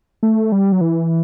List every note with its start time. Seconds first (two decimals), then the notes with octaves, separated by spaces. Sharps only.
0.23 A3
0.52 G3
0.72 F#3
0.81 E3